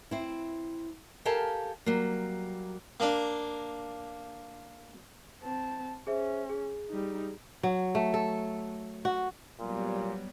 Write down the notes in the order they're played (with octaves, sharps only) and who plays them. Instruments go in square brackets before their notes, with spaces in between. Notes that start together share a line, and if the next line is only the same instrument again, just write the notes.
[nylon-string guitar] C4 E4
G4 A4 A#4 F5 G#5 A5
F#3 G3 A#3
[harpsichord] A#3 D4
[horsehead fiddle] C4 A5
[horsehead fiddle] C#4 [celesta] G#4 C5 E5
[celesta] G#4
[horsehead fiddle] G3 D#4
[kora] F#3
A3
A4
F#4
[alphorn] A#2 [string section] F#3 G3 B3